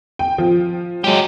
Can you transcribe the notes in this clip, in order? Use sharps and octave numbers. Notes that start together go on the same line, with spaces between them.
G5
F3
F#3 G#3 C#4 G4